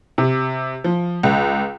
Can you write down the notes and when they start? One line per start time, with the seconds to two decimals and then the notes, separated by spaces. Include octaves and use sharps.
0.18 C3
0.84 F3
1.23 C#2